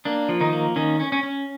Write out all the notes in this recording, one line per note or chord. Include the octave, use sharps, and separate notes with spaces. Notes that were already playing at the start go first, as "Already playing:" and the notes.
A#3 D4
F3
D#3 D#4
A#3
D#3 C#4 D#4
C#4
C#4
C#4